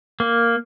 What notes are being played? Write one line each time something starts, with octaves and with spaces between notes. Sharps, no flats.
A#3